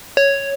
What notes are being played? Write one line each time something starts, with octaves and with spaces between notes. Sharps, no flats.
C#5